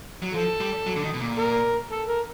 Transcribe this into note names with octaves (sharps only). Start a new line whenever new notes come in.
F#3
F3 A4
G3
F#3
D3
D#3
B2
A#2
A#4
A4
A#4